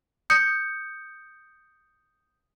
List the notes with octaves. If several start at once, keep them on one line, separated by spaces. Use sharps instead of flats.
D#6 G6 C#7